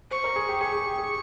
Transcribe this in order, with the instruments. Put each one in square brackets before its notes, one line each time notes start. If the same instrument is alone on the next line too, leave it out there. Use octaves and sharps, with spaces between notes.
[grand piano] C5 [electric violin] C#6
[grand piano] A#4
G#4
G4
[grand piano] G#4 [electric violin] C#6
[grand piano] G#4
G4
G#4